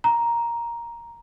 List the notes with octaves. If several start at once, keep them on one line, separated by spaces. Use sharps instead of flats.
A#5